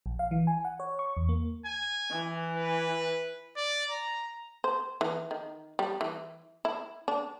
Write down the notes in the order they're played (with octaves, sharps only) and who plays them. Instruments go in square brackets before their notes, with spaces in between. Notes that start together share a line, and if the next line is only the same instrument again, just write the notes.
[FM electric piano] A#1
F5
E3
G#5
F#5
C#5
C#6
E2
A#3
[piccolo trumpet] G#5
[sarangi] E3
[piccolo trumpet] B4
D5
A#5
[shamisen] C5
E3
D#3
G3
E3
E4
D4